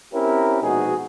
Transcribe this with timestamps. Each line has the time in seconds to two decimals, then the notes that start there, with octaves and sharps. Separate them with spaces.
0.13 C4 C#4 E4 G4 A#4
0.62 A#1 B2 G#3 D#4 F#4 G#4